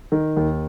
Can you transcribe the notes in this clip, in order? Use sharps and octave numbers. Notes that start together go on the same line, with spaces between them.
D#3
D#2